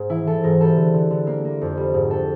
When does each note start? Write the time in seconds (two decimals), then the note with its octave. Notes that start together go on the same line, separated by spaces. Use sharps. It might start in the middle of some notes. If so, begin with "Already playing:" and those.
Already playing: G#2
0.09 E3 E4
0.27 E3 A4
0.43 G#2 A#4
0.60 G3 A4
0.76 D3
0.94 D3
1.10 D3
1.27 A#3
1.45 A#3
1.61 F2
1.77 G3
1.94 G#2
2.11 A4